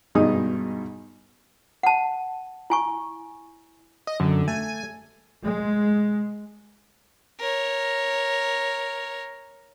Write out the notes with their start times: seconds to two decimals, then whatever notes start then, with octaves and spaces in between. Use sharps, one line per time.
0.15 G#1 G2 B2 D#4 G#4 D#6
1.83 F#5 A5
2.70 E4 G#5 C#6
4.07 D#5
4.20 F#2 D3
4.48 A3 G#5
5.44 G#3
7.40 A#4 C#5